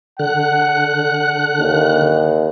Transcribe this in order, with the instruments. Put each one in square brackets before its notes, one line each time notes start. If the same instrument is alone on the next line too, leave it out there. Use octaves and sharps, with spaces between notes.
[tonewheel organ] D3 F#6 [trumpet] F#5
[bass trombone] D#2